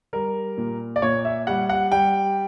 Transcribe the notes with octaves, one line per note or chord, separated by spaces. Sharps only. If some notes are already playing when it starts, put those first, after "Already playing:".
G3 A#4
A#2
D5
A#2 C#5
E5
G3 F#5
F#5
G3 G5